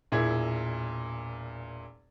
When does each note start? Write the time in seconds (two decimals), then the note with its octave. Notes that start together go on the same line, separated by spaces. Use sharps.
0.12 E1 A#2 E4 G#4 G#6